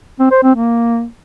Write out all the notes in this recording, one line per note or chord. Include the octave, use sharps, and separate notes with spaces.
C4
C5
C4
A#3